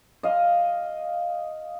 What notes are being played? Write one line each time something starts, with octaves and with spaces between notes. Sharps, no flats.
D#5 F5